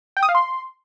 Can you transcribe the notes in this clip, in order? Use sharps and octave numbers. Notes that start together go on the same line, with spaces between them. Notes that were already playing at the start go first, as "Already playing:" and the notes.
G5
D#6
F5
C6